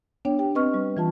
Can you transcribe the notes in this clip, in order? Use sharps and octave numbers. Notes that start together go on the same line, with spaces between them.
B3 D4 C#5 G5
G4 G5
C4 B4 D#5 C#6 F6
G3
E3 F4 A5